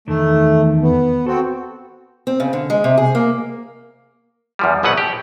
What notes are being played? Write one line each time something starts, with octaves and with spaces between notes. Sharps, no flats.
E2 D#3 A3
B3
C4 F#4 A4
C4
C#3
D3
G#3
C3
G#4
A#3
E2 F3 G3
A#1 B2 F#3 B4 F#5
G4